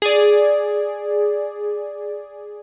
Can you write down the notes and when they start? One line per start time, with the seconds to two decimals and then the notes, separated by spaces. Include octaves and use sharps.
0.02 G#4 D5